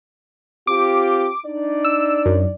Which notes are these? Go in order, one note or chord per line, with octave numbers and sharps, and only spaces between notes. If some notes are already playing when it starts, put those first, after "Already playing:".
C4 F4 G4 D6
D4 D#4 D5
E6
F#2